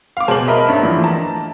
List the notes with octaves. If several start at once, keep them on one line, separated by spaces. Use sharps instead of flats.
F5 D6
B2 G#4 C5 A5 F#7
A#4 D#5 E5 B5
G2 C#4
D3 E3 F3
A5 A#5